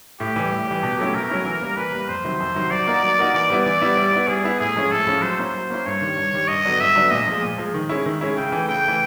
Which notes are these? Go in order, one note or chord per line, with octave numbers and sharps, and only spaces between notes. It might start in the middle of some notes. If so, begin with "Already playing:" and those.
A2 G4
E3 G3
A2
E3 G3
B2
F#3 A3 C#4 E4
B2 A#4
F#3 A3 C#4 E4
E3
G3 A#3
E3 B4
G3 A#3
F2 C5
C3 D#3 F#3
F2
C3 D#3 F#3
F#3 D5
A#3 D#4 F#4 A#4
F#3
A#3 D#4 F#4 A#4
E3 D5
G3 B3 E4
E3 D5
G3 B3 E4
G3
B3 E4
G3 G#4
B3 E4
A2 G#4
F3 G#3 C#4 E4
A2 A4
F3 G#3 C#4 E4
F#3 C5
A#3 C#4 E4
F#3
A#3 C#4 E4
G2 C#5
D#3 G3
G2
D#3 G3
G2 D#5
D3 F#3 B3 D4
G2 E5
D3 F#3 B3 D4
A#2 D#5
F3 G#3
A#2
F3 G#3
D#3
G#3 C#4 E4
D#3
G#3 C#4 E4
C#3 G5
E3 A3
C#3 G5
E3 A3